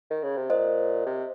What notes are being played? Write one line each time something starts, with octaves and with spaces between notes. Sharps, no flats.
D#3
C#3
C3
A#2 C5 D#5
C3